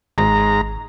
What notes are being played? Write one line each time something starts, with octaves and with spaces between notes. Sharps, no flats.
G#1 G#2 A#5